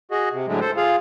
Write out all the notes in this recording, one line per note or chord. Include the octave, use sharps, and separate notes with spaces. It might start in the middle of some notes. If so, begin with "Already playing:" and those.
F#4 G#4 D#5
C3
A2 D3 F#3 G#3 A3
A4 C5
F4 G#4 F5